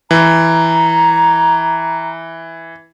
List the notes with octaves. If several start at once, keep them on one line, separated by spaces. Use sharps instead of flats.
E3 A#5